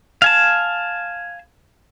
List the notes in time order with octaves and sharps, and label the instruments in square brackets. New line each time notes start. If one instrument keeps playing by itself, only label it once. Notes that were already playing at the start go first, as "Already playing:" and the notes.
[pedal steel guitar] F5 G#5 A5